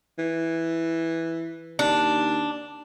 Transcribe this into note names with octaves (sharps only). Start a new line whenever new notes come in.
E3
D#2 D4